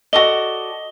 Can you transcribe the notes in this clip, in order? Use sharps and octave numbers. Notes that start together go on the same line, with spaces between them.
F#4 A4 D5 D#5 G7